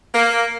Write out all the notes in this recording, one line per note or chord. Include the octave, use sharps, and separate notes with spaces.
A#3